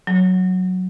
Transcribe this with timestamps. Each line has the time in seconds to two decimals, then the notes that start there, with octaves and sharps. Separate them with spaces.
0.07 F#3